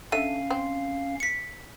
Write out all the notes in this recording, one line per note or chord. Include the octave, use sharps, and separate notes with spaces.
D3 C#4 A4 E5 F5 D#7
C4
B6 C#7